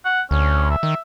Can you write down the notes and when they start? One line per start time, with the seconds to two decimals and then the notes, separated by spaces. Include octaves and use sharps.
0.05 F#5
0.31 D2 C#4
0.70 E5
0.83 D#3